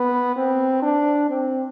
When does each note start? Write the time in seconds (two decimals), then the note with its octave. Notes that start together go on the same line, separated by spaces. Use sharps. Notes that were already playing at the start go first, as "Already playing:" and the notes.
Already playing: B3
0.36 C4
0.82 D4
1.29 C4